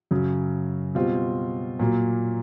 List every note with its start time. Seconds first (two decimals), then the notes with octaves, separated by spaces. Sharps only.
0.11 F#2 C#3 F#3
0.95 B2 G3 C4 F4
1.79 A#2 F#3 A#3